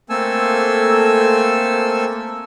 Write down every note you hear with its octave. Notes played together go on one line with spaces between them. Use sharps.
A3 A#3 C4 A4 G#5 E6